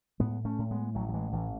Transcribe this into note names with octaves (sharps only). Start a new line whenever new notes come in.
A2 G#3 B3
A3 C#4
A2
G#3 B3
A1 F#3 A3
F#3
E3 G#3
A1 E3